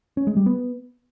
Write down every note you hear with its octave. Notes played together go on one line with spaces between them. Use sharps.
C#4
G#3
G3
B3